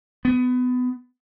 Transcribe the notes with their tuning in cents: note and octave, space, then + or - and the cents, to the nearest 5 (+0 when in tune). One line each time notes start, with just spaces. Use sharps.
B3 +20